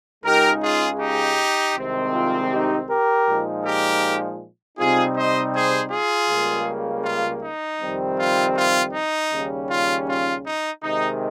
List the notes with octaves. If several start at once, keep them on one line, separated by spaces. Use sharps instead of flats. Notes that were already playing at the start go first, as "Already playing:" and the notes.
C#2 C#3 G#3 D#4 G4 A#4
F4 G#4
D#4 G4
C2 C3 D#3 G#3 C4
F4
D#4 G4
G4 A#4
A#2 F3 G#3 D#4
G4 A#4
C3 G3 C4 D#4 F4 G#4
C5 D#5
G#4 C5
F4 G#4
C#2 C#3 G3 A#3
F4
D#4
F2 C3 D#3 G3 C4
F4
F4
D#4
D#2 C#3 G3 C#4
F4
F4
D#4
C3 D#3 G#3 D#4